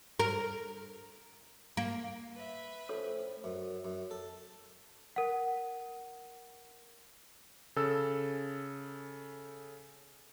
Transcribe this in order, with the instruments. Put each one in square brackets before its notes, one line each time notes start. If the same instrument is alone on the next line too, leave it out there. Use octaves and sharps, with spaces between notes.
[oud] A#4
A#3
[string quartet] B4 E5
[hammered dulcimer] A2 F3 C#4 [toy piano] A4 C#5 D#6
[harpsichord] F#2
F#2
A4
[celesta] A#4 F#5
[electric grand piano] C#3 A4 E6